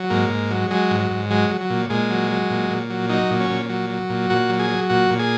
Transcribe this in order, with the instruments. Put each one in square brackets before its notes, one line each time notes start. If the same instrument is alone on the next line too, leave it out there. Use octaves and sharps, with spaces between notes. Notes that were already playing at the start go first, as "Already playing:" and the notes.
Already playing: [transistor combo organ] F#3
G#2 A#3
G#2
F#3
F#3 G#3
G#2
F#3
G#2
F#3 G#3
F#3
F#3
A#2
A#2 G#3
F#3
F#3
A#2
A#2
F#3
F#3 D#4
A#2
C#4
A#2
F#3
F#3
A#2
A#2 F#4
F#3
G#4
F#3
A#2 F#4
A#2
G#4